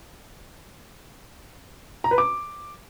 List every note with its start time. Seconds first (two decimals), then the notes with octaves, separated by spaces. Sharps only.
2.04 A#5
2.11 B4
2.18 D6